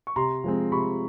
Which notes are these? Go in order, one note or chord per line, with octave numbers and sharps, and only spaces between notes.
C#6
C3 A#5 C6
F3 G#3 C4
C3 B5 C#6